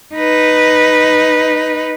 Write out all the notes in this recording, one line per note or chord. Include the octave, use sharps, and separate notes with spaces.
D#4 B4